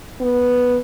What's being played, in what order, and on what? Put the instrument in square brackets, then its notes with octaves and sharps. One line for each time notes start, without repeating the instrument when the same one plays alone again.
[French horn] B3